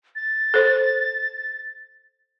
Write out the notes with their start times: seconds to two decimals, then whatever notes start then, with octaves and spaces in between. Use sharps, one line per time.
0.15 A6
0.54 A4 C5